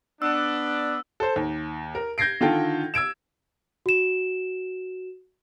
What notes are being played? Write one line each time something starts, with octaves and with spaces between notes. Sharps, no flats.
B3 D4 E6
A4 C5
D#2
A#4
G6 G#6 A#6 C7 D7
D3 D#3 F4 A4 G5
E6 G#6 D7 E7
F#4 E7